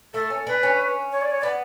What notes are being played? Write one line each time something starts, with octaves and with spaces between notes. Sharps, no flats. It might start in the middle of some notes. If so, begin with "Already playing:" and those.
A3 A4
C#4
D4 B4
C#4
C#5
D5
C#5
B3 D5